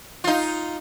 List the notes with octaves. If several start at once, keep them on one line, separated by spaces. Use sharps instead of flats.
D#4 F4